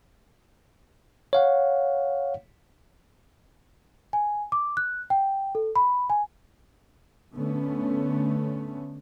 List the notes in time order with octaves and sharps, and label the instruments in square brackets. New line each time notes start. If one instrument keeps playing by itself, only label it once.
[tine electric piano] C#5 F5 F#5
[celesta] G#5
D6
F#6
G5
A4
B5
G#5
[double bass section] D3 A3 B3 C#4